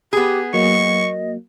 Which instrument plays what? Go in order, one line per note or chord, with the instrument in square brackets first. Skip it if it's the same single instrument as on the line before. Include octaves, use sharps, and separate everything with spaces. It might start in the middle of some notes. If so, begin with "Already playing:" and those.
[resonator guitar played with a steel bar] B3 G#4 [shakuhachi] G4
[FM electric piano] F#3 A#3 [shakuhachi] D#5 [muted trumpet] C#6